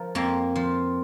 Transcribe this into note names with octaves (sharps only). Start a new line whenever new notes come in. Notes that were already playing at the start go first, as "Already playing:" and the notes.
Already playing: F3 A#4
F2 A#3
F3